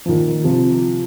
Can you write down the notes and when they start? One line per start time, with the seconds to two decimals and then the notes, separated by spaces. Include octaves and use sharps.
0.06 F3
0.09 A#2 D#3
0.44 C3 F3